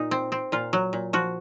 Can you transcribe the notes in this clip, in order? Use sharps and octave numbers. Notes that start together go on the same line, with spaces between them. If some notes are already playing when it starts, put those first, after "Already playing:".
Already playing: A#2 D#4
C4
C4
A#2 F4
F#3
A#2
F3 F#4